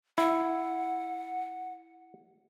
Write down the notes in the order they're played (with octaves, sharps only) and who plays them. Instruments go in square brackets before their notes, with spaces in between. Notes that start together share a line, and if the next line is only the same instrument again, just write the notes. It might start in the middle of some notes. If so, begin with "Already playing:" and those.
[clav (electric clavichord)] E4 [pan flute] F#5